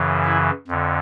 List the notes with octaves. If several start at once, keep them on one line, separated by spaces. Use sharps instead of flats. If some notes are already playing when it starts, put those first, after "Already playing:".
Already playing: F#2 C#3 E3
E4
F2 D3